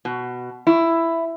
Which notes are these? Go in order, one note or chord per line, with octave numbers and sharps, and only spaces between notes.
B2
E4